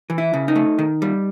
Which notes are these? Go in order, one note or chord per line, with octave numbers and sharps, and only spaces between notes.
E3
E4
C#3
D#4
A3
D#3
G3